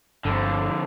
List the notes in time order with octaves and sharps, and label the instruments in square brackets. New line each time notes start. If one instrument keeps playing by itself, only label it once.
[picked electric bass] G1 [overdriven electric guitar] F2 D3